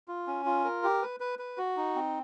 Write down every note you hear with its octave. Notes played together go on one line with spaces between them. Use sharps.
F4
C#4
F4
A#4
G4
B4
B4
B4
F#4
D#4
C4